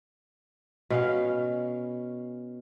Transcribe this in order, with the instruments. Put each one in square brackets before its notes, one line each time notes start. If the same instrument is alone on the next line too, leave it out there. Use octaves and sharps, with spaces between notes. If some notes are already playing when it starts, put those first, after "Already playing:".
[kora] B2 C#4 F5